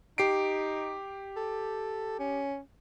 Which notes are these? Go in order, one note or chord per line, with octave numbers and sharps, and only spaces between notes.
D#4 G4 C7 D7
A4
C#4